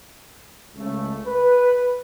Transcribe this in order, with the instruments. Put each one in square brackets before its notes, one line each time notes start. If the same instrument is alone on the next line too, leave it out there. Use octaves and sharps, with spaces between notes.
[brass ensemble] C#2 C#3 A3
B4